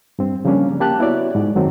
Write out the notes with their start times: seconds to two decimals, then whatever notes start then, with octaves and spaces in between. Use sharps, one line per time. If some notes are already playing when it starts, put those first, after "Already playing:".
0.19 G2 C4
0.45 C#3 F3 G3 A#3 C#4 D4
0.81 A#3 G4 A5 F#6
0.99 B3 E4 F#4 C#5 D5
1.35 G#2
1.55 F#2 D#3 F#3 A3 C4